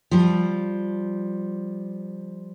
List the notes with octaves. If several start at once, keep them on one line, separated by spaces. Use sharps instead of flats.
F3 G3